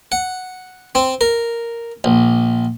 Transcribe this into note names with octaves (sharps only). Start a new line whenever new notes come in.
F#5
C4
A#4
A#1